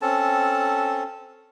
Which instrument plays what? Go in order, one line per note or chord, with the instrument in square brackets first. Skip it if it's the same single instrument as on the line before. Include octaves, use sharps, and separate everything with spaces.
[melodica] C4 C#4 A4 A5